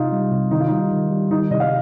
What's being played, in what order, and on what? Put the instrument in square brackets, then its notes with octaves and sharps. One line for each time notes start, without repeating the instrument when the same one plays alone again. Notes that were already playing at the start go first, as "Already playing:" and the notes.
Already playing: [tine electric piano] C3 [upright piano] D#4 F4
[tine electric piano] G3
C3
[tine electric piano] D#3 [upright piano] D#4
[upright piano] F4
[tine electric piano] G3 [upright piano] D#4
[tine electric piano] D#3
G3
[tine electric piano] D#3 [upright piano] D#4
[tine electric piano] C3 [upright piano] D#5
[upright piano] F5